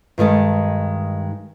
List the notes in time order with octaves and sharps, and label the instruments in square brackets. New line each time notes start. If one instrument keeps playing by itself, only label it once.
[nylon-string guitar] G2 D#3 G#3 A4